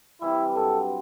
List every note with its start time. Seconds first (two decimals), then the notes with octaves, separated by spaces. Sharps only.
0.21 C3 E3 G3 E4
0.55 G2 F#3 C4 A4